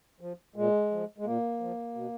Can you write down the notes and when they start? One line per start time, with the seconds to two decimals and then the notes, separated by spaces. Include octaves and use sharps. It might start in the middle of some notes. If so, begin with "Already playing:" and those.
0.21 F3
0.56 A#2 G#3
0.91 F3
1.18 G#3
1.25 A#2 A#3
1.60 F3
1.95 B2